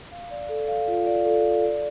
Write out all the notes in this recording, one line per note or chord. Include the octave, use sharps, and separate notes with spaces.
F5
D5
A4
F5
F4
D5
A4
A4
D5